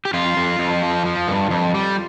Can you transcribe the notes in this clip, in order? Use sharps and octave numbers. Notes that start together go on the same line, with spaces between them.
G4
F2 F4
F2
F2
F3
F3
G2
F2
G3